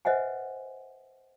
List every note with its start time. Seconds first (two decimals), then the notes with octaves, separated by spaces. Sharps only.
0.05 B4 C5 D#5 E5 F#5 G#5